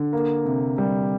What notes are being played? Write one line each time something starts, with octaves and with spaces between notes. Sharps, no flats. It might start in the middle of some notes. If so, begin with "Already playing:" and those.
Already playing: D3
A#3
C3
G3